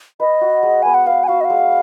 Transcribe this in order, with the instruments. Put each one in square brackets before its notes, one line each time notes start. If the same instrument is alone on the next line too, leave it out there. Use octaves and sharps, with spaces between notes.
[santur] B4 [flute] D#5
[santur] F#4
G#3
[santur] B3 [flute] G#5
[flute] F#5
[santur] B4 [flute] F5
[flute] G#5
[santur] F#4 [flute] F5
[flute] D#5
F5
[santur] G#3